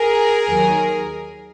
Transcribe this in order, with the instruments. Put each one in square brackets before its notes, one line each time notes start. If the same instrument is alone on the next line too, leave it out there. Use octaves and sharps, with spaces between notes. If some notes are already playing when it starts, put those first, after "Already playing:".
Already playing: [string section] G#4 A#4
D#2 D#3 F#3